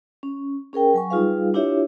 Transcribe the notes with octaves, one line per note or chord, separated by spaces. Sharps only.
C#4
C#4 G#4 A#4 G5
F#3 G#5 C#6
G3 D#4 F4 G#4 B4 F5
D4 E4 F4 G4 C#5 E5